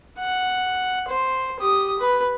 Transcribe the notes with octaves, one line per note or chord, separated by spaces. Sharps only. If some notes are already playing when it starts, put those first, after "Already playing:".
F#5
C5
G4 D#6
B4